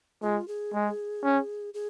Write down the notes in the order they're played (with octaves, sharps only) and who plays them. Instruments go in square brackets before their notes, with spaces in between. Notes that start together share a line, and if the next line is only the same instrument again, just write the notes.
[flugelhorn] G#3 [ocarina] F4
[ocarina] G#4
[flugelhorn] G#3
C#4
[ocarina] G#4